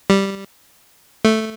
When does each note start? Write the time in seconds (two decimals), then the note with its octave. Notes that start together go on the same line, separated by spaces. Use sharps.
0.10 G3
1.25 A3